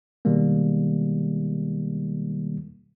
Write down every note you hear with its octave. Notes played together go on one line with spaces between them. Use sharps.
B2 D#3 G3 G#3 A#3